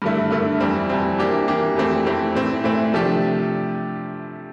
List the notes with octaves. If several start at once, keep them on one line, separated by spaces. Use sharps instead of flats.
G2 D3 A3 E4
G2 D3 A3 E4
F2 E3 G3 C4
F2 E3 G3 C4
E3 A#3 D4 G4
E3 A#3 D4 G4
F2 E3 A3 C4 G4
F2 E3 A3 C4 G4
A2 E3 A3 C4
A2 E3 A3 C4
C3 F3 A3 D4 G4